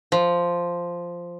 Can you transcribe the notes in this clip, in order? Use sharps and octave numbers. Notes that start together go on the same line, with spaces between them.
F3